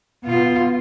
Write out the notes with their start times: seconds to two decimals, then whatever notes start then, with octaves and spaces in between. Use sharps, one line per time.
0.24 B2 F4